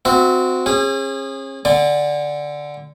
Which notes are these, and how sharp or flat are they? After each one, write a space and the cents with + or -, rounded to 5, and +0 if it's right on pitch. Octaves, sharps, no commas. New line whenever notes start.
C4 -20 F#4 -20 E5 +0
C#4 -40 G#4 -25
D3 +0 D5 +0 G#5 -45